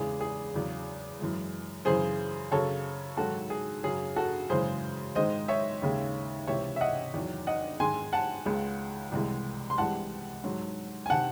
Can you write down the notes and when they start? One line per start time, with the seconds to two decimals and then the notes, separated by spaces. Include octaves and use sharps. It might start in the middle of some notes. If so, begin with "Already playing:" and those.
Already playing: E2 C#3 E3 G#3 G#4
0.21 G#4
0.54 E2 C#3 F#3
1.20 F#2 E3 G#3
1.85 F#2 C#3 E3 G#4 C5
2.51 F#2 C#3 F#3 A4 C#5
3.17 G#2 D#3 F#3 F#4 A4
3.50 G#4
3.84 F#2 C#3 F#3 G#4
4.16 F#4 A4
4.50 F#2 C#3 E3 G#3 G#4 C5
5.15 G#2 D#3 G#3 C5 D#5
5.48 C#5 E5
5.82 D#2 C#3 G#3
6.47 C#2 C3 E3 C#5 E5
6.76 E5
6.81 D#5 F#5
7.14 E2 D#3 F#3
7.47 D#5 F#5
7.80 G#2 D#3 G#3 G#5 C6
8.13 F#5 A5
8.46 C#2 C#3 G#3
9.12 C2 C3 E3 G#3
9.70 C6
9.78 C2 C3 E3 G#3 F#5 A5
10.44 G#2 F#3
11.06 G#5
11.10 C3 D#3 F#5 A5